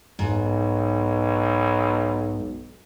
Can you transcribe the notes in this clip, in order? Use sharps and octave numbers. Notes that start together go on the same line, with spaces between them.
B1 G#2